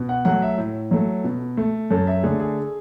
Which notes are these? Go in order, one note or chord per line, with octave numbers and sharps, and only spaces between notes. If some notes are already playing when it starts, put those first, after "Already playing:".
Already playing: B2
F#5
F#3 A3 F#5
E5
A2
F#3 A3
B2
A3
F#2 A4
E5
D3 A3 G#4
G#4